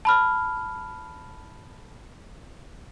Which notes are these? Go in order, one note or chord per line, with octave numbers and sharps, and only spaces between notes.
A5 B5 F6